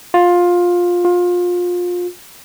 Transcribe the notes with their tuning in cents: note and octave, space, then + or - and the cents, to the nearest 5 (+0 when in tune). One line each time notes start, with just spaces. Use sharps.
F4 +15
F4 +25